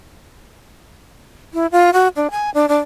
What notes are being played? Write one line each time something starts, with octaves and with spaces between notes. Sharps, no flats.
E4
F4
F#4
D4
G#5
D4
D4